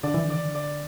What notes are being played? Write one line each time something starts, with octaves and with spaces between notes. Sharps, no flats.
D3 D5
E3
D3
E3 D5
D3
D5